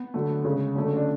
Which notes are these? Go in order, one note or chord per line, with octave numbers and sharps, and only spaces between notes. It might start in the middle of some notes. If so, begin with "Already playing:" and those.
Already playing: B3
D3 F#3 A3
C#3 G#3 C#4
D3 F#3 A3 C#4
C#4
D4